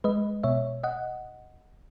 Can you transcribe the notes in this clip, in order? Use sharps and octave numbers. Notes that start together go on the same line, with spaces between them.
G#3 B4 D#5
B2 C#5 E5
D#5 F#5